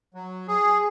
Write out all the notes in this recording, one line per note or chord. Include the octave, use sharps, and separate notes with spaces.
F#3
G#4